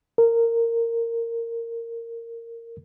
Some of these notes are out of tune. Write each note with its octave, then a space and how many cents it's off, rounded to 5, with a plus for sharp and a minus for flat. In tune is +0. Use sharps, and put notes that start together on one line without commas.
A#4 -15